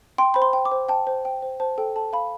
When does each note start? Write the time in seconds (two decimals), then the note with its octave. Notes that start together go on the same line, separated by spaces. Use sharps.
0.18 G5 C6
0.34 C5 B5
0.42 C6
0.53 G5
0.65 D6
0.72 C5
0.88 G5 A5
1.07 C5
1.25 G5
1.42 C5
1.60 C5 A5
1.78 A4 G5
1.96 A4 A5
2.13 F5 B5